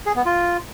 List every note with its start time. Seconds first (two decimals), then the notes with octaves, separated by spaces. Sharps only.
0.06 G#4
0.16 B3
0.26 F4